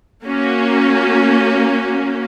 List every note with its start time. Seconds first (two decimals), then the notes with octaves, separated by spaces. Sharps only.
0.25 A#3 C#4 F#4